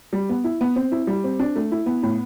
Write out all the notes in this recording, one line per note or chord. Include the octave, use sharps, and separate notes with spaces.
G3
B3
E4
B3
C4
E4
G3
C4
D4
A3
E4
B3
A2